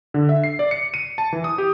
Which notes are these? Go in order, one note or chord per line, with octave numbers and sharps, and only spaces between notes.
D3
E5
C7
D5
C#7
D#7
A5
E3
D#6
G4